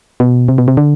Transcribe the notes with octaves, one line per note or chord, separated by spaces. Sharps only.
B2
C3
B2
C3
D3